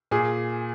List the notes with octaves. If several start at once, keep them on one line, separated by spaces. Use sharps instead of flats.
A#2 G#4